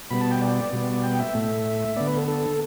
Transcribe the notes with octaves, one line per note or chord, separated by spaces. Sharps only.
B2 G3 B3 B5
A5
G5
D5
B2 G3 B3
G5
E5
A2 A3
D3 B3 D5
B4
A4
A4